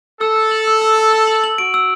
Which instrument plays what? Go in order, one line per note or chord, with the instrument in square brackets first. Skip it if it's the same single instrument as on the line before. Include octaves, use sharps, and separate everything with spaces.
[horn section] A4 [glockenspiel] E6
[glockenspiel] E6
F#7
E6
E6
E6
E6
F#7
F#7
[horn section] F#4 [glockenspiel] D7
[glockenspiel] E6